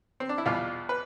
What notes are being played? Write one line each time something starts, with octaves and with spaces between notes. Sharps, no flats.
C4
D4
E4
E2 B2 G3 F4
B4